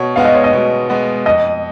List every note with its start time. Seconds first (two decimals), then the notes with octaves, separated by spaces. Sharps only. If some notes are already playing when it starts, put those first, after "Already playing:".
Already playing: B2 C#5
0.16 G#3 B3 F#4 F5
0.25 D#5
0.34 C#5
0.44 D#5
0.53 B2
0.89 G#3 B3 F#4
1.26 F2 D#5